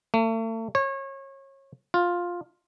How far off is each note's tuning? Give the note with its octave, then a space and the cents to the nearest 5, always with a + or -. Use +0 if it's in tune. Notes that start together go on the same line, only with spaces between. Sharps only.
A3 +40
C#5 -30
F4 +10